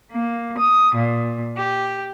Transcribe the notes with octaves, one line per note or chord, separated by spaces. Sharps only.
A#3
D#6
A#2
G4